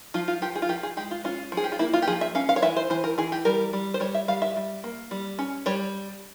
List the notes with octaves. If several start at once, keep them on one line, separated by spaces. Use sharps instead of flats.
F3 F4
F4
F3 G4
G#4
F4
F3 G4
G#4
G#3 G4
F4
C#4 F4
F3
G#4
G4
F4
A#3 E4
F4
G4
F3 G#4
E5
C#4 F5
F5
C#5
E3 E5
C5
E3 C5
A#4
E3 G#4
G4
G3 A#4
G3
C5
G3 C#5
E5
G3 F5
E5
G3
A#3
G3
C#4
G3 C#5